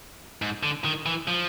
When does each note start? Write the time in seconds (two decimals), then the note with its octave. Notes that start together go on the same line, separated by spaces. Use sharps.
0.42 G#2
0.63 D3
0.85 D#3
1.06 E3
1.28 F3